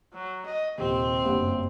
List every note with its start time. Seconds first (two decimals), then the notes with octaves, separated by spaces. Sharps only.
0.14 F#3
0.46 D#5
0.78 D#1 C3 C4
1.24 F#1 G2 B3